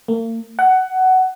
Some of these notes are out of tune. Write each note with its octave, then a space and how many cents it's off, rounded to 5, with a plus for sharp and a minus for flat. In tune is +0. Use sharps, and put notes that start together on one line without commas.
A#3 -45
F#5 +15